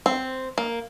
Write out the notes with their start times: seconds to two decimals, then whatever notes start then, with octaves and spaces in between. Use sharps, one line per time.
0.06 C4
0.58 A#3